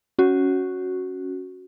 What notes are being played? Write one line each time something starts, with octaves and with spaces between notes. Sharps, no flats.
C#4 F#4